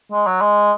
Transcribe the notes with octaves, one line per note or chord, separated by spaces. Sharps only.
G#3
F#3
G#3